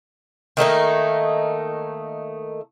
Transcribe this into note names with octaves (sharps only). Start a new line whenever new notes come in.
D#3 A3 A#3 D#4